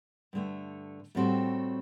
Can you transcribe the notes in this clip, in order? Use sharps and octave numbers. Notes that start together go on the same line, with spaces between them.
G2 D3 A3
A2 G3 C4 F#4 A4